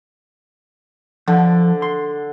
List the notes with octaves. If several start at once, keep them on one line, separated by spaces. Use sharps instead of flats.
D3 F3
C6